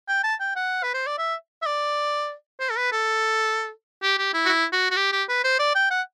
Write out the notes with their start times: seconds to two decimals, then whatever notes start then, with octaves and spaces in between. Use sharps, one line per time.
0.08 G5
0.24 A5
0.41 G5
0.56 F#5
0.83 B4
0.94 C5
1.07 D5
1.18 E5
1.62 E5
1.67 D5
2.60 C5
2.70 A4
2.77 B4
2.92 A4
4.03 G4
4.18 G4
4.34 E4
4.45 F#4
4.49 E4
4.73 F#4
4.91 F#4
4.96 G4
5.12 G4
5.29 B4
5.44 C5
5.59 D5
5.75 G5
5.91 F#5